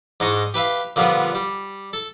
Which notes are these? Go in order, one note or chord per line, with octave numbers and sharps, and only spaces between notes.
G#2 D4 D#5 A#5 C#6
G4 B4 E5 F5
A#2 D3 F3 G3 B3
G3
A4